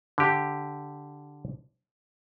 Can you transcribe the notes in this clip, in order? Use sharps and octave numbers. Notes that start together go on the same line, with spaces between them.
D3 G4